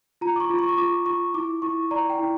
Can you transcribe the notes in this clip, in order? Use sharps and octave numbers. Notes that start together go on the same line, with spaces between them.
F4 A#5
D6
C#6
F4
C#6
C#6
F4 D6
F4 C#6
E4 D6
E4 C#6
D5 A#5
G5
E4